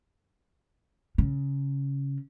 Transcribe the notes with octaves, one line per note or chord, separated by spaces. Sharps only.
C#3